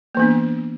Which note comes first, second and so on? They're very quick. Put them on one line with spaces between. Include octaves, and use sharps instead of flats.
A#3 E3 B3 D4